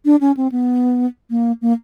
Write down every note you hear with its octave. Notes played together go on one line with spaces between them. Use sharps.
D4
C#4
C4
B3
A#3
A#3